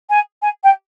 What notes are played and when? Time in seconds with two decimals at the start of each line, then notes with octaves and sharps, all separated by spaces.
0.09 G#5
0.42 G#5
0.63 G5